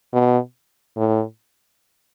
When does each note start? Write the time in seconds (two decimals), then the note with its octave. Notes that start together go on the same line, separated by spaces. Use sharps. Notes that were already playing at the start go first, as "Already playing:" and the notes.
0.13 B2
0.97 A2